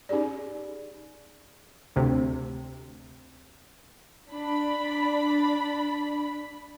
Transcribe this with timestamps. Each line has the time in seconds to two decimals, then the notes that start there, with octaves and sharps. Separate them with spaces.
0.09 C#4 D#4 G4 G#4 D5
1.96 D2 C3
4.33 D4 B5